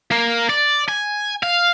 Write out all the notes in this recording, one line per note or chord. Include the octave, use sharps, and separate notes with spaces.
A#3
D5
G#5
F5